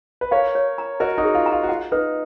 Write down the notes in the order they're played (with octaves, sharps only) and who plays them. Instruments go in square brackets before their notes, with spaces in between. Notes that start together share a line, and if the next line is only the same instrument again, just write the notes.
[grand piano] B4
[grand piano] A#4 C#5 [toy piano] F5
[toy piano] C#5
A#5
[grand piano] F#4 A#4 [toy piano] D#5
[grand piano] D#4 F#4
[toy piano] G#4
[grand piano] F4
[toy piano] A#5
[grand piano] F4
F#4
[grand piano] F4 [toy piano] F#5
[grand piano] D#4 [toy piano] B4